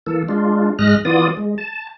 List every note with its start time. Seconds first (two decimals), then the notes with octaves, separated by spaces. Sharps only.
0.06 E3 A#3 A4
0.29 G#3 D4 F4
0.79 G#2 G#3 D#5 F6 F#6 A#6
1.05 E3 B3 F4 D5 D#6
1.37 G#3
1.58 A5